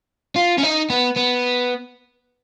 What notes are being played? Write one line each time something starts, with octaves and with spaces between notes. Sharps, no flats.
F4
C#4
D#4
B3
B3